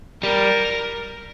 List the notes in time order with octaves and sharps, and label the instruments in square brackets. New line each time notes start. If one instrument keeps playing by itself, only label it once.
[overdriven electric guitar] G3 [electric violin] A#4